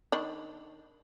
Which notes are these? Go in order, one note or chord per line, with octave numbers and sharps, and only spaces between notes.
D#3 D4 B5